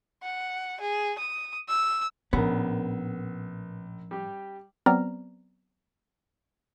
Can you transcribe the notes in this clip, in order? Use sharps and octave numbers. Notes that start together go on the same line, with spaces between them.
F#5
G#4
D#6
E6
A#1 A2 F3 B3 C#4 A#4
G3 G4
F#3 B3 C4 D5 A#5 F6